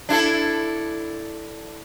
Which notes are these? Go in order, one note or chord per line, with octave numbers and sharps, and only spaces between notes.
D4 E4 A4